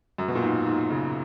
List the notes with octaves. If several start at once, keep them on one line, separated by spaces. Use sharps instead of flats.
F#2
B2
A#2
G#2
G#2
C#3